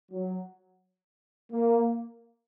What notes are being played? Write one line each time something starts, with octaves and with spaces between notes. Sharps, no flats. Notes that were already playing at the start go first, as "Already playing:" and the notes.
F#3
A#3